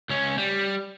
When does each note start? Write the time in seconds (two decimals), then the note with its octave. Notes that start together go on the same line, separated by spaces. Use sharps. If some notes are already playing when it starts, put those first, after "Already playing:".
0.09 C#2 C#4
0.38 G3